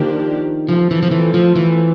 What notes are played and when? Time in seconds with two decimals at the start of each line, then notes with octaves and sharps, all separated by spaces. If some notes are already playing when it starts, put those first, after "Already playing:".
Already playing: D#3 F3 A#3 D4 G4 A#4
0.68 F3 A3 C4 F4 A4
0.91 E3
1.03 F3
1.11 E3
1.34 F3
1.56 E3